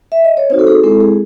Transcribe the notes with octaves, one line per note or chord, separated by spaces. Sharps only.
E5
D#5
C#5
C4 D#4 F#4 C5
A4
G#4
G#3 C4 E4 A4
G#4